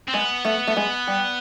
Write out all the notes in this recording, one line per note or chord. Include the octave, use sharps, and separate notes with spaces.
C4
G#3 B3
A3
A3
G#3
G3